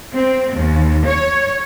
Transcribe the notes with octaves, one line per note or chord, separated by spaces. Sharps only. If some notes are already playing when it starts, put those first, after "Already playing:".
C4
D#2
C#5